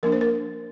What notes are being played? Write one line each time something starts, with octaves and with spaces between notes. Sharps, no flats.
F3 A#3 D4 A#4
C5
A#4